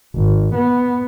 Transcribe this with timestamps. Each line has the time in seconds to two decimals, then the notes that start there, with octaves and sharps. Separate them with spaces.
0.16 G#1
0.55 B3